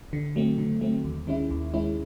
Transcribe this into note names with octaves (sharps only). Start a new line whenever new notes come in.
D3
F#3 A3 C4
D3
F#3 A3 C4
D#2
D#3 G#3 C#4 E4
D#2
D#3 G#3 C#4 E4